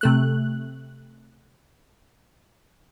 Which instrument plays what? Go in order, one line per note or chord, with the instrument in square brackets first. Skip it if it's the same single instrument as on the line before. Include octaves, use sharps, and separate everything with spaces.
[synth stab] C3 A3 F#6